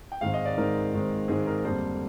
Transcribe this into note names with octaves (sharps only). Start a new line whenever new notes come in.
G5
G#2 D#3 G#3 C4 F5
D#5
D5
G#2 D#3 G#3 C4 A#4
G#2 D#3 G#3 C4
G#2 D#3 G#3 C4 G#4
A#4
F2 D3 G3 A#3 D4 C5